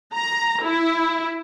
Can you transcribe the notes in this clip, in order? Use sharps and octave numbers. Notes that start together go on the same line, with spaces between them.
A#5
E4